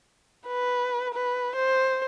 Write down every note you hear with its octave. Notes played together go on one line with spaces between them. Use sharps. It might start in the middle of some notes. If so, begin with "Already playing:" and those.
B4
B4
C5